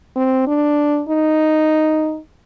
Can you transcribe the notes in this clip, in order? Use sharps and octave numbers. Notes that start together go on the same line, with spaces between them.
C4
D4
D#4